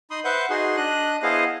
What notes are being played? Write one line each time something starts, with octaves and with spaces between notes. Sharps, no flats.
D#4 B5 C6 D#6
B4 C5 E5 F#5 G6
D#4 F#4 G#4 C6
D4 D#5 F#6
B3 E4 G#4 C5 D#5 F5